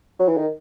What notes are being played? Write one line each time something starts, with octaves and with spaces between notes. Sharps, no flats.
F#3
E3
D#3